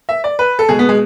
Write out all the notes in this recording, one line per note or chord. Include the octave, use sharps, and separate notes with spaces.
E5
D5
B4
A4
B2 G#3 G#4
B3
G#3